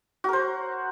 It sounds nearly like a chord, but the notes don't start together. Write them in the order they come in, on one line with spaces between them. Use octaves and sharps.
F#4 A#4 C5